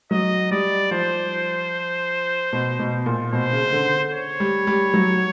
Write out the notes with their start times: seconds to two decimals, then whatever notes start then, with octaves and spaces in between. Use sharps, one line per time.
0.11 F#3 D#5
0.51 G3 D5
0.91 F3 C5
2.53 B2
2.79 B2
3.06 A#2
3.33 B2 C5
3.53 C#3
3.72 D3
4.13 C#5
4.40 G3
4.67 G3
4.94 F#3